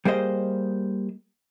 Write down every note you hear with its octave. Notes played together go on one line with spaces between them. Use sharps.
G3 A#3 G#4 C5 D#5